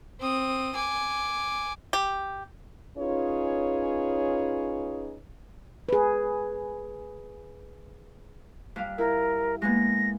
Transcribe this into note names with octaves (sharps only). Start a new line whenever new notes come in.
C4 D#6
G#5 D6
G4
C#4 D#4 F4 G#4 B4 C#5
G#4 B4
G2 G3 F5
E4 A#4
G#3 A#3 B3 A#6